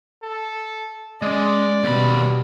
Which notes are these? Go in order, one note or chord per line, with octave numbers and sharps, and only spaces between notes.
A4
G#3 C#4 D5
D#2 B2 G3 B5